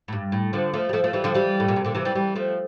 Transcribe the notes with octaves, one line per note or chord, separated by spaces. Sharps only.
A2
G2
A2
D3 F3
F3 A3
G3
F3 A3
F3 A3
E3 G3
D3 F3
E3 G3
A2
A#2
C3
A#2 D3
C3 E3
E3 G3
E3 G3
F3 A3